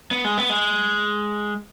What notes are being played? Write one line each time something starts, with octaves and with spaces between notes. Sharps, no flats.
B3
G#3
B3
G#3